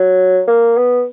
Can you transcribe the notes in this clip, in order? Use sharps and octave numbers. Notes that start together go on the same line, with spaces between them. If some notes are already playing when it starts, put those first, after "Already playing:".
Already playing: F#3
A#3
B3